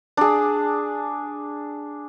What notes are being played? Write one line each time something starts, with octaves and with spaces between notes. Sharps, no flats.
D4 G#4